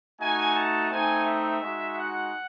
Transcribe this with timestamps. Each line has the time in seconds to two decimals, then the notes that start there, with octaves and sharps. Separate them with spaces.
0.19 A3 D#4 F#4 G#5
0.55 A5
0.90 A3 C4 D#4 G#5
1.26 E5
1.61 G#3 D#4 F#4
1.97 F#5